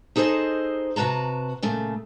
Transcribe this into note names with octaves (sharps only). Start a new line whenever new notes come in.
D#4 G#4 A4 B4 C5 D#5
C3 F#4 B4 A5 A#5
A#2 C#3 A3